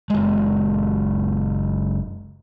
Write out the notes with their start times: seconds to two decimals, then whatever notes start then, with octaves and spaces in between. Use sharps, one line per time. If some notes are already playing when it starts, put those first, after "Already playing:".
0.10 F#1 G#3